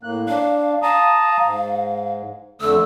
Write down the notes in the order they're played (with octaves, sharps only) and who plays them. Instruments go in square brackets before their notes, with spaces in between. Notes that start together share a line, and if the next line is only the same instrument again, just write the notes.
[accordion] A2 A#3 F#6
[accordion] D4 [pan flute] F5
[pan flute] F5 [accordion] A5 A#5 D#6
[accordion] G#2
[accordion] F2 D3 A3 [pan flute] E6